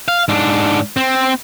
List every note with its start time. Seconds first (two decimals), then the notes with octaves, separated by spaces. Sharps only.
0.08 F5
0.29 G#2 D4
0.97 C4